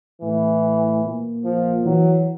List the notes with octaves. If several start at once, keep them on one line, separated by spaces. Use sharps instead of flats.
A2 E3
A#2
F3
E3 F#3